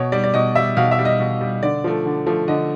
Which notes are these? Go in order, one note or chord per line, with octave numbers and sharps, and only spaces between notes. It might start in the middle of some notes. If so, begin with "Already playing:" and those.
Already playing: B2 C#5
G3 D5
D5
B2 D#5
G3 E5
B2 F5
E5
G3
D#5
B2
G3
D3 D5
F3 A3
D3
F3 A3
D3 D#5